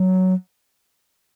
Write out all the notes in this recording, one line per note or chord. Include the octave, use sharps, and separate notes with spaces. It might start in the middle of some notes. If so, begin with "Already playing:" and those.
Already playing: F#3